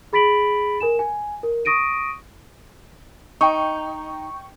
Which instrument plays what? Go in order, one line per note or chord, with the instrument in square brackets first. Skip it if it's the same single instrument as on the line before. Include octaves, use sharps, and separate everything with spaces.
[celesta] G#4 B5 A6 B6 D7 F#7
A#4 G#5 E7
G#5
A#4
C#6 D#6 A#6 D7 D#7
[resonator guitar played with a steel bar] D#4 [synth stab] G5 C#6